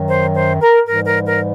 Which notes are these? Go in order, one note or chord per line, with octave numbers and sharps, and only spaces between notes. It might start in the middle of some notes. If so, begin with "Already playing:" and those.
Already playing: F#2 D#3 F#3
C5
C5
A#4
G#2 E3 G3 A#4
A#4
A#4